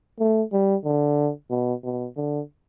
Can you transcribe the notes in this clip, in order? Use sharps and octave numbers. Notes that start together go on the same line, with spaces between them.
A3
G3
D3
B2
B2
D3